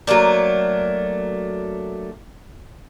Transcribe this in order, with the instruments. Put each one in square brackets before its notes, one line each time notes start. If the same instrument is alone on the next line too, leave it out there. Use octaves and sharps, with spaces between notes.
[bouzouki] F#3 A3 A#3 D4